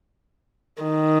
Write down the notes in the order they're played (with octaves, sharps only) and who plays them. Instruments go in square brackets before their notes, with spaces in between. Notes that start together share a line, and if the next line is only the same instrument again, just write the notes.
[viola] D#3